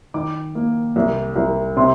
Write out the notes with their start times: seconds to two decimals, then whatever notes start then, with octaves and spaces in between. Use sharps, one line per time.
0.14 D#3 D6
0.55 A#3
0.96 C2
1.36 C2
1.77 C3 C6